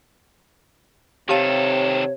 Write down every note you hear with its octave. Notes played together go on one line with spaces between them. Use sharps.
C3 D#3 G4 A4 C#5 F5 A5